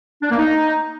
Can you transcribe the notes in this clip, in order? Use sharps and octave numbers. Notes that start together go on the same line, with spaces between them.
D4
A#3
D#4